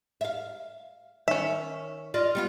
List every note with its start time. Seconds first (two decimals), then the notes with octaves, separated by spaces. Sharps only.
0.21 E5 F5
1.28 D#3 C#4 E5
2.14 F4 D5 D#5
2.35 G3 B3 F4